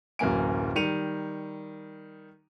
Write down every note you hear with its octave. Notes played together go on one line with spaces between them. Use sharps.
D1 F#2 E3 A#3 G#5 D7
D#3 G3 C#7 D#7 F7